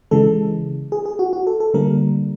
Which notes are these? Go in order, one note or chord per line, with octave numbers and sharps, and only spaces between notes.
C#3 E3 G#3 A4
G#4
G#4
F#4
F#4
A4
A4
D3 G3 A#3 A#4